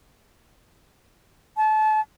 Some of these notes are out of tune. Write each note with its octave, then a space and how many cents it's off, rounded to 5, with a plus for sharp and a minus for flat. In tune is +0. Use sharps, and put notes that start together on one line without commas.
A5 -30